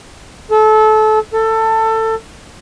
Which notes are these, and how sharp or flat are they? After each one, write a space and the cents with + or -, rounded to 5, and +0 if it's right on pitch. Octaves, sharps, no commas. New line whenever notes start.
A4 -25
A4 +20